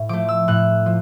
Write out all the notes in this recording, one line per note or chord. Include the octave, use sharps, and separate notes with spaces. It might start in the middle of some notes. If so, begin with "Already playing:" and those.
Already playing: A2
F3 A3 D6
E6
A2 F#6
F3